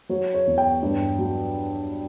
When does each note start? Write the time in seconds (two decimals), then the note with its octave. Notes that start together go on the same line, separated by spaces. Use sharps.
0.09 F#3 C#5
0.34 C#5
0.47 E2
0.58 G5
0.82 G2
1.18 F#3